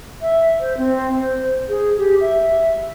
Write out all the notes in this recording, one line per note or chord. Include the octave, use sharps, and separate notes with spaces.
E5
C5
C4
C5
G#4
G4
E5